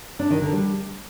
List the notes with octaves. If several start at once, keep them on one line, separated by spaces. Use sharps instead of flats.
D4
D#3
D3
G3